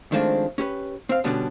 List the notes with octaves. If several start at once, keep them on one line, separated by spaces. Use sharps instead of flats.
D#3 F3 G#3 A3 C4 D4
C#4 G4 B4
C4 F5
B2 D3 G3 B3 C#4 D4